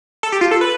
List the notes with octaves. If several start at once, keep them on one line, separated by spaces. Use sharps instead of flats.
A4
G4
F4
A4
B4